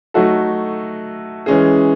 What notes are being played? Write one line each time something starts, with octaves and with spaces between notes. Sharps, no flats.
F#3 A3 D#4 F#4 A4
E3 G#3 C#4 G#4